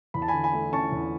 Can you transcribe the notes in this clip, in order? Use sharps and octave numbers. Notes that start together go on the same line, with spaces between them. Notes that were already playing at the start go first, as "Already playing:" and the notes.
E2 B5
A5
G#5 B5
D3
G#5 B5
A3
C#4 A5 C#6
E2